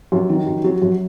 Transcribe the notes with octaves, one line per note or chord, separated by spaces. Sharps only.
F#2
D#3
F#2
F#3
F#2